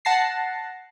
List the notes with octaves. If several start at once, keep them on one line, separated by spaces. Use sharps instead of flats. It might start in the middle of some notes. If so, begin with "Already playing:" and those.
F#5 A5 A#6 C7